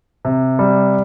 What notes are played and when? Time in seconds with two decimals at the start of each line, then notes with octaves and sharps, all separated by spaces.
0.25 C3
0.59 G3